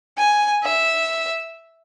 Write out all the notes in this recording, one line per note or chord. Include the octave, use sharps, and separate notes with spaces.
G#5
E5